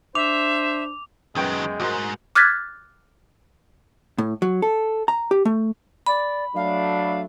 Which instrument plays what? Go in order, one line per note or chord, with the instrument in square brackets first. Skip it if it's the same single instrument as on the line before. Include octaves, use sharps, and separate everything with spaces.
[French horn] D4 [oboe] C5 [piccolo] E5 [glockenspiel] D6 F7
[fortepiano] F#2 B3 G5 [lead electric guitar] D#3 F#3 [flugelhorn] G#3
[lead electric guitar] D#2 G#2 [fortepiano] F#4 A#4 C5
[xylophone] D6 F6 F#6 G#6 A6 B6
[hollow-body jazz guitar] A2
F#3
A4
A#5
G4
A3
[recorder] D5 [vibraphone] B5
[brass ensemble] F#3 A3 D4 [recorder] F5